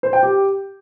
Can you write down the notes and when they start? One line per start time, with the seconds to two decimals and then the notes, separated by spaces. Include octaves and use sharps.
0.03 C5
0.13 G5
0.23 G4